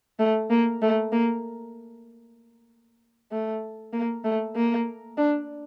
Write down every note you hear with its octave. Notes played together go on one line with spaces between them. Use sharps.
A3
A#3
A3
A#3
A3
A#3
A3
A#3
D4